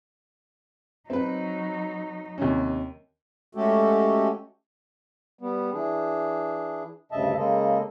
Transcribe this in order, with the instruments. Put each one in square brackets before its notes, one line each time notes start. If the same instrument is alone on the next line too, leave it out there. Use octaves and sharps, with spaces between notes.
[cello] F#3 D#4 [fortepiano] C4 B4
[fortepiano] D#2 C3 C#4
[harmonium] G#3 A3 C#4 F#4 G4 A4
G3 B3
E3 D4 G#4
D2 G2 C#3 D#5 E5 A5
C#3 G#3 A#3 A4 D#5